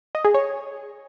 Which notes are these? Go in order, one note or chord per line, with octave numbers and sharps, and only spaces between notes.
D#5
G#4
C#5